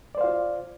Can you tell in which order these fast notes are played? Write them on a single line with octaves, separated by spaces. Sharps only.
D5 C5 F5 F4